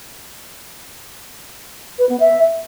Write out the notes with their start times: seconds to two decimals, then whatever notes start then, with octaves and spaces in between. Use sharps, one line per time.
1.99 B4
2.09 B3
2.20 E5